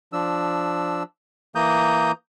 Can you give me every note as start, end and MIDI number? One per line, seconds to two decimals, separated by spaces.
0.13 1.03 53
0.13 1.03 62
0.13 1.03 88
1.55 2.12 52
1.55 2.12 58
1.55 2.12 82
1.55 2.12 87
1.55 2.12 91